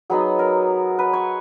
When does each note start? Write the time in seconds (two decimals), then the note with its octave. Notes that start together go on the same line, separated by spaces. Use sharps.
0.10 F#3 B3 D#4 G#4
0.39 A#4
0.99 B4
1.13 C#5